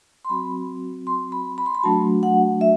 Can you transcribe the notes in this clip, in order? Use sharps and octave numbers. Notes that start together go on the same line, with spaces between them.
C6
F#3 C4 F#4 B5
C6
B5
B5
C6
B5
F#3 A3 D4 F#4 A5
F#5
E5